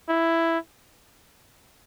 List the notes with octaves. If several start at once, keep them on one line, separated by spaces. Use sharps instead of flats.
E4